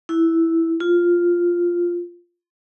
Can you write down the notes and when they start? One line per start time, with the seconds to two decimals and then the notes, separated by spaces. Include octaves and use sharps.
0.09 E4
0.80 F4